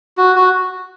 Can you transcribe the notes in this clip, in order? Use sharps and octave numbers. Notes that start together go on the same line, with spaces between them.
F#4
F#4